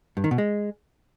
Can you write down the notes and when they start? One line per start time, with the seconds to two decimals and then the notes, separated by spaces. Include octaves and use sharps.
0.17 G2
0.24 D#3
0.31 B2
0.38 G#3